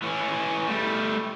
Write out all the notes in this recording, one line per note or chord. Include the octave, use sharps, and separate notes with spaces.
E3 C#4
G3 A3